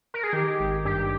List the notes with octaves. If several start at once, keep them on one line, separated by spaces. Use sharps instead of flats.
A#4
G#4
D#3 G4
G#1
G2 G4